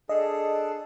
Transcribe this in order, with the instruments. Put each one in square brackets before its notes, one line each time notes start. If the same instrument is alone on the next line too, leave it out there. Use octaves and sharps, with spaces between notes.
[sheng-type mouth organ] D4 G#4 A4 [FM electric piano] D#5